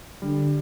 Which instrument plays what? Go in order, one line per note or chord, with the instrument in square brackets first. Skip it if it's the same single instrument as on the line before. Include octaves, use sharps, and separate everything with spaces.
[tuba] D3 [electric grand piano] G3